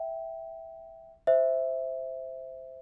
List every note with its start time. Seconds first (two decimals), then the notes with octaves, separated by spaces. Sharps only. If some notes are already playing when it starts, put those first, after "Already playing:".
Already playing: E5 G5
1.27 C5 E5